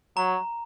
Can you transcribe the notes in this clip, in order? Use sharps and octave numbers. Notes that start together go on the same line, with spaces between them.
F#3 A#5